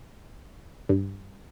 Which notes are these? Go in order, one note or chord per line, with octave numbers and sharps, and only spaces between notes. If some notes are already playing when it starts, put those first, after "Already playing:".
G2